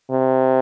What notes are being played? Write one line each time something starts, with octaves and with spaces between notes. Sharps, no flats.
C3